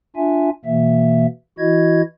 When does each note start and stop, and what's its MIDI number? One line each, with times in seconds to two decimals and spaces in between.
0.16 0.50 62
0.16 0.50 65
0.16 0.50 76
0.16 0.50 80
0.65 1.26 47
0.65 1.26 52
0.65 1.26 58
0.65 1.26 76
1.59 2.02 52
1.59 2.02 64
1.59 2.02 66
1.59 2.02 75
1.59 2.02 92